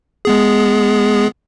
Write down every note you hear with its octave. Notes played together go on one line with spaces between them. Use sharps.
G#3 B3 G#4